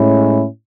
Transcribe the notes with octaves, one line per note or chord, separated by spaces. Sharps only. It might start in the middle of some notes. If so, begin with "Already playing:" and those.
Already playing: A2 G#3 C#4 E4